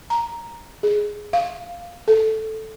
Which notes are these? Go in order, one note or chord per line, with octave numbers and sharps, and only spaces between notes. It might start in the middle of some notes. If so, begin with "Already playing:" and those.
A#5
G#4
F5
A4